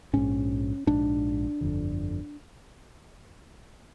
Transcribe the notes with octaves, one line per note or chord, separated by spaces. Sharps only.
A#1 G#2 C#4
A#1 G#2 D4
G1 F2 D3